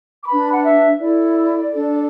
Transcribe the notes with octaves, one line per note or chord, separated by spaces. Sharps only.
D6
D4 B4 B5
F#5
E5
E4 A4 D5
D4 A4